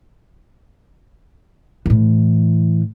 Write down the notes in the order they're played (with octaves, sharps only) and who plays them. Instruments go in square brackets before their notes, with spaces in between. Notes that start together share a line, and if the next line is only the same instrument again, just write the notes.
[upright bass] A2 E3